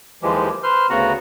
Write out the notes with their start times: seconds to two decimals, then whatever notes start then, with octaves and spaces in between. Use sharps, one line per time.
0.23 D#2 E3 F3 G#3 G4
0.63 B4 C5 C6 F6
0.90 D2 C#3 B3 F#4 F#5 A#5